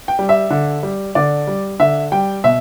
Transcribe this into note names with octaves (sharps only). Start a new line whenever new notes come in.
G5
G3
E5
D3
G3
D3 D5
G3
D3 E5
G3 G5
B2 E5